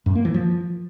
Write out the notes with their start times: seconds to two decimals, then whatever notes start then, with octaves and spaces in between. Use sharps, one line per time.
0.06 F#2
0.15 A#3
0.25 E3
0.34 F3